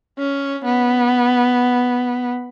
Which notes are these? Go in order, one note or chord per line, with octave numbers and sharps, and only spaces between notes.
C#4
B3